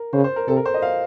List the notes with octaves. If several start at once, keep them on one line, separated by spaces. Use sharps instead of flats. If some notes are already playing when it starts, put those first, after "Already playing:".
Already playing: A#4
C#3 C5
C5
A#4
C3 A4
A#4
C5
D#5
F5